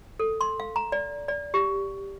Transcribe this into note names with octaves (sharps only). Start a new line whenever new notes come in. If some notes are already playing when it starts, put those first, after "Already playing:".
A4
C6
F5
A#5
D5
D5
G4